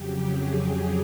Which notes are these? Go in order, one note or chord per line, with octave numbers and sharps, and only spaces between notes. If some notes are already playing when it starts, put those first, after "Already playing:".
Already playing: F2 C#3 F#3 G4
G#4
G#4